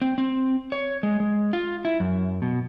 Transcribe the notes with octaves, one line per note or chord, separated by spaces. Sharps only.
C4
C4
C#5
G#3
G#3
F4
E4
F#2
B2